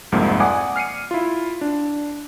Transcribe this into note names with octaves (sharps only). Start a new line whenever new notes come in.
C2 F2 G#2 A#3 A#4
D5 F#5 G#5 D6 D#6
F6 C7 C#7 D#7
E4 F4
D4